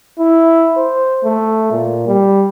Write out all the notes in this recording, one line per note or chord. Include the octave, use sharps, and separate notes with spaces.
E4
C5
A3
A#2
G3